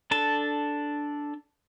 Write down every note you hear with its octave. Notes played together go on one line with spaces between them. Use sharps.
D4 A4 A5